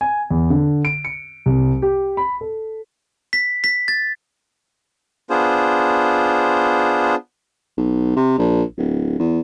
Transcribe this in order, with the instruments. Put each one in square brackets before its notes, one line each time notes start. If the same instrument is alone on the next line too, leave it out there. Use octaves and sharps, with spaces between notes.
[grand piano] G#5
E2
D3
D7
C#7
C2
G4
B5
A4
[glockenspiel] B6
B6
A6
[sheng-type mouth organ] B3 D4 F4 G#4 C5
[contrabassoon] B1
C3
A#1
D1
E2